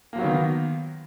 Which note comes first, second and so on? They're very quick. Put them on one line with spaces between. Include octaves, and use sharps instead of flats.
A#3 F3 F#3 B3 D#3